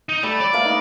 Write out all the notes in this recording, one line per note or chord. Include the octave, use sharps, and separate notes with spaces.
D#4
G3 A3
C#5 D5
A3 A#3 B4
A#3 D#4